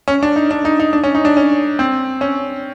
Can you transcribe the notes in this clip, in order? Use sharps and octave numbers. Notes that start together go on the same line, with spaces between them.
C#4
D4
D#4
D4
D#4
D#4
D4
C#4
D#4
D4
C#4
C4
C#4